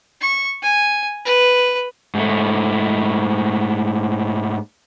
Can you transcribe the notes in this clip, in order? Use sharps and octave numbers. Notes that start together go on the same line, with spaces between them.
C#6
G#5
B4
G#2 A3